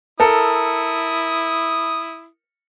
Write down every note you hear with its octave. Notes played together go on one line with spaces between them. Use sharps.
E4 A4 A#4 D#6